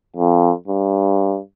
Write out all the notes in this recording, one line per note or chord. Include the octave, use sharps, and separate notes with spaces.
F2
G2